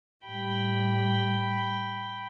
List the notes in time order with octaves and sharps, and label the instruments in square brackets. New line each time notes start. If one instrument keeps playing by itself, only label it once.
[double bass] A2 G3 [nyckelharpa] G5 B5